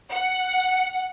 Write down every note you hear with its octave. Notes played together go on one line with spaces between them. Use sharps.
F#5